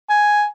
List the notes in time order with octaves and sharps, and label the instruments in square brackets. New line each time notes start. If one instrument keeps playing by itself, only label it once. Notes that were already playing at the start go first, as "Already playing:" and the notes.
[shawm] G#5